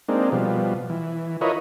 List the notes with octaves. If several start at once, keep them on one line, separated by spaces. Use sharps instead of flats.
G#3 A#3 C4 D4 D#4
B2 F3 G3
E3
E4 F4 A#4 B4 C#5 D#5